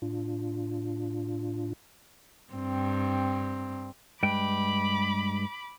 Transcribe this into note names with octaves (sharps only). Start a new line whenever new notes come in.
A2 D4 F4
G2 C4
G2 G#3 G5 B5 D6